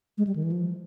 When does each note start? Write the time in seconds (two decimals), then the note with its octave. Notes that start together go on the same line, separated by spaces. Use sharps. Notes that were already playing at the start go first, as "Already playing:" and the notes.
0.18 G#3
0.27 G3
0.36 D#3
0.43 E3
0.52 F3